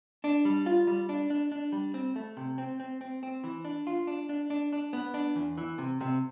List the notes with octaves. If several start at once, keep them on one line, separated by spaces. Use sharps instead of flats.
D4
G3
F4
G3
D4
D4
D4
G3
C4
A3
C3
C4
C4
C4
C4
E3
D4
F4
D4
D4
D4
D4
B3
D4
E2
E3
C3
C3